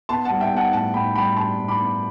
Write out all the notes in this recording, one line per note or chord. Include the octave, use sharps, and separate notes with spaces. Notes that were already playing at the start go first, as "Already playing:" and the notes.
B3 A5 C6
G3 F#5 A5
E5 G5
B3 F#5 A5
A2 F#5 A5
A2 G5 B5
G3 G5 B5
D4 A5 C6
A2
B5 D6
B3